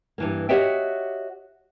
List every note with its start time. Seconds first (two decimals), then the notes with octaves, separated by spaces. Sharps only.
0.18 G2 E3 A#3
0.49 F#4 G4 C#5 D#5 E5 G5